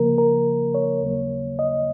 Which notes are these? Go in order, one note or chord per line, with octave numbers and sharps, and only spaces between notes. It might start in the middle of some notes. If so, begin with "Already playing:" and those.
Already playing: C#3 F3 A#3 A#4
A#4
C#5
D#2 C#3 F#3 A#3
D#5